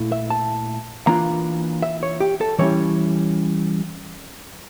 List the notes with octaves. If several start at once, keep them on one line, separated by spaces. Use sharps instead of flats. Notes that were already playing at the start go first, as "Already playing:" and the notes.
Already playing: A#2 A3 E4
E5
A5
E3 A#3 D4 F4 A#5
E5
C#5
G4
A4
E3 G3 C#4 E4 C#5